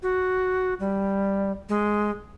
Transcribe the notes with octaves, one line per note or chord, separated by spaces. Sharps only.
F#4
G3
G#3